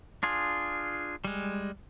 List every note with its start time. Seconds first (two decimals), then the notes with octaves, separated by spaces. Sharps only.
0.23 D4 F4 G#4
1.25 G3 G#3